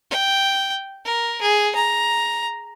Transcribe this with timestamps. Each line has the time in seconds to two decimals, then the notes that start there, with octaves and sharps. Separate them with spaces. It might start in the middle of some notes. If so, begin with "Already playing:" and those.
0.11 G5
1.05 A#4
1.42 G#4
1.76 A#5